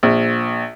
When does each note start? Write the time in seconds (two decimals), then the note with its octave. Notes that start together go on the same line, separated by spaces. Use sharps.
0.03 A#1